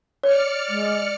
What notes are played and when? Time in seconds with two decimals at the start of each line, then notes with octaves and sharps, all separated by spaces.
0.24 C#5 D5 F6 C#7
0.69 G#3